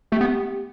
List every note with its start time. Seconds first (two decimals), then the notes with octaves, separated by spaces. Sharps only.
0.12 A3 G4
0.21 B3